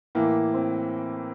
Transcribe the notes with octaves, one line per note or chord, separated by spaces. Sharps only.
A2 E3 A#3
C4